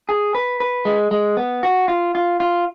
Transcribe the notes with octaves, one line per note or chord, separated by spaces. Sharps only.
G#4
B4
B4
G#3
G#3
B3
F#4
F4
F4
F4